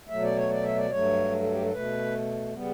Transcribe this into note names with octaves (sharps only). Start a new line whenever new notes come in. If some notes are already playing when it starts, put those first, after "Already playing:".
B2 F#3 A3 E5
D5
C#5
D5
E5
D5
G2 F#3 A3 C#5
A4
A4
G4
A4
B2 A3 B4
C#3 G3 B3